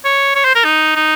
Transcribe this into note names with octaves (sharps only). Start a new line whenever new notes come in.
C#5
C#5
C5
A#4
D#4
D#4